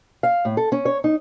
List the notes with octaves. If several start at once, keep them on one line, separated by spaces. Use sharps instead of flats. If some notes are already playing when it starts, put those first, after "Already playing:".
F5
A2
A4
C#4
C#5
D#4